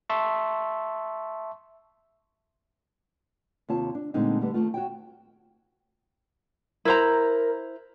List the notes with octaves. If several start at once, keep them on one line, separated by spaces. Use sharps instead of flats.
E5 A5 C6 C#6
D#2 C3 F4 C#5 A5
D4
A#2 D3 G#3 A3 C4 D#4
D3 G3 A3 B3
D#2 G#2 A3 F4
F#4 C#5 G5
E4 A#4 C5 A#5